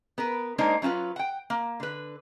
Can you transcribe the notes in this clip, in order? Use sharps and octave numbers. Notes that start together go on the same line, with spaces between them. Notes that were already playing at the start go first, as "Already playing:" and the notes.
B3 A#4 B4
G#3 A#3 D4 D#4 C5
F#3 C#4 E4 F4 B4
F#5 G5
A#3
D3 B4